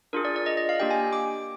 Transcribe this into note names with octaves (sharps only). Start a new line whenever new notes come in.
D4 F4 G#4 A#4
D5
D5
D#5
D#5
F5
A#3 D4 G4 G5
G#5
D6